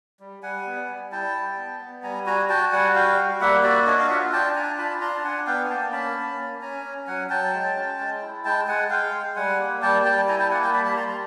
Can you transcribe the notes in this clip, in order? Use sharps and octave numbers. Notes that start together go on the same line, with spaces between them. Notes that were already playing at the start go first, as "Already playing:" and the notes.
G3
G3 F#5 G#5
B3
G3
E4 G5 A5
G3
B3
B3
G3 G#5 A#5
F#4 G#5 A#5
F#4 G5 A5
G3 F#5 G#5
F#4 F5 G5
G3
A#3 E5 F#5
F#4 D5 E5
D4 C#5 D#5
D#5 F5
F4 E5 F#5
D4 G5 A5
D4 G#5 A#5
F4 A5 B5
D4 A#5 C6
A5
D4 F#5 G#5
B3 F5 G5
G#5
A#3 G5 A5
C#4 A5 B5
A#3
C#4
C#4 G#5 A#5
C#4
F#3 F#5 G#5
F#3 G5 A5
G#3
C#4
G#3
E4
G#3 G5 A5
G#3 F#5 G#5
G#3 F5 G5
G#3
G3 F#5 G#5
A#3
G3 G5 A5
G3 G5 A5
E4 G#5 A#5
G5 A5
A#3 F#5 G#5
G5 A5
G3 A5 B5
A5 B5
G3 A#5 C6
A#5 C6